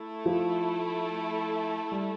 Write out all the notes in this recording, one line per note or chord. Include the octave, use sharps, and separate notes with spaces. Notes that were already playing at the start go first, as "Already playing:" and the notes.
Already playing: A3 E4 A4
F3 F4
G3 G4